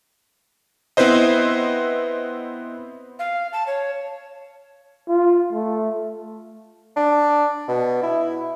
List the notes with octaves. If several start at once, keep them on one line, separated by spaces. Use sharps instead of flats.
B3 C4 E4 B4 C5 D#5
F5
A5
C#5
F4
A3
D4
B2
E4